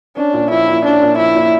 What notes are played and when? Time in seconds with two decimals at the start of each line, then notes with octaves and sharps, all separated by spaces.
0.17 C#4 D4
0.34 A#2
0.51 F3 E4
0.68 A#2
0.85 C#4 D4
1.02 A#2
1.18 F3 E4
1.36 A#2